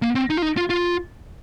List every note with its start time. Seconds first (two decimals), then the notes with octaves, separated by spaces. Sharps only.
0.02 A#3
0.15 C4
0.30 D#4
0.37 F4
0.42 D#4
0.57 F4
0.70 F4